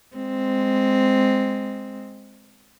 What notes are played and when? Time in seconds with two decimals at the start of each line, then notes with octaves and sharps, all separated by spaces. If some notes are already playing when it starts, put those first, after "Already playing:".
0.16 G#3 C4